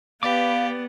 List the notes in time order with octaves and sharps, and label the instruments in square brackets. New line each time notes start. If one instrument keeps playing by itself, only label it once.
[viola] B3 [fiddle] G4 [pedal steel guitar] B4 D5 D6 [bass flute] F5